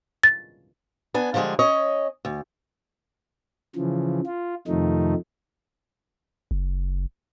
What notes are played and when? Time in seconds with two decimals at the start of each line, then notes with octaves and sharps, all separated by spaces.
0.24 A6
1.14 B3 D4 G#5
1.34 D3 F3 G3 G#3 G#4
1.59 C#4 C#5 D#5
2.25 D2
3.75 C#3 E3 F3
4.26 F4
4.67 F2 C3 D#3 F3 A3 D#4
6.51 F#1